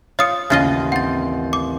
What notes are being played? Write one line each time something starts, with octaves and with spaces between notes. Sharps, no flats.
F4 C#5 D#6 C#7
A1 D#2 C#3 F4 D#5
C4 F#5 A6
D6